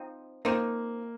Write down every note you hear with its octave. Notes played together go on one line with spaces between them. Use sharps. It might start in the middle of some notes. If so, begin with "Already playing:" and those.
Already playing: F3 C4 D#4
F3 A#3 C4 D#4